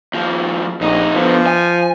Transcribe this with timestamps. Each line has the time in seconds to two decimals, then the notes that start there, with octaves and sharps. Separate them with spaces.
0.14 D#2 F3
0.81 A#1 F2 D#4
1.15 D3 F3 B3
1.46 G#5